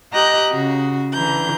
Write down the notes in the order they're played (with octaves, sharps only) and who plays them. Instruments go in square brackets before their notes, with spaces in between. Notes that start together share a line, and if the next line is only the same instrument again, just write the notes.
[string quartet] G4 D#5 A#5 F#6 G6
C#3 F#4
D3 E3 A#5 G6